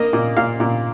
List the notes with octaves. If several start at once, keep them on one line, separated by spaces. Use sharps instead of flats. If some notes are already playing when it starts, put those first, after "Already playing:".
Already playing: A#3 D#5
A#2
A#2 F5
A#2